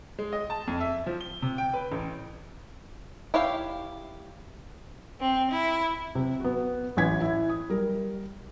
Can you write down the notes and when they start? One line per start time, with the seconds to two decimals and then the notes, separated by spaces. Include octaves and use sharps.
0.19 G#3
0.33 D#5
0.50 A5
0.67 F2
0.80 E5
1.06 F3
1.21 G7
1.42 C3
1.58 G5
1.74 B4
1.92 A1
3.34 E4 G4 C#5 F5
5.20 C4
5.50 E4
6.15 C3
6.40 B3 F#4
6.97 A1 E3 C#4 G#6 B6
7.21 E4
7.50 D#6
7.70 G3 A#4